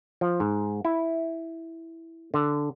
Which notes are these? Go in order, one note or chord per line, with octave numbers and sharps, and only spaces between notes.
F3
G#2
E4
D3